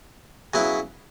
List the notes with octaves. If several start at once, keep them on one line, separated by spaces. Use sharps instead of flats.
C#3 F#3 B3 E4